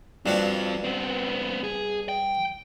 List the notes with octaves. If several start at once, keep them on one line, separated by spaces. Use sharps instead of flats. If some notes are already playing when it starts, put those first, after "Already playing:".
G2 C4 D4 F4 F#4
B3 C4
G#4
G5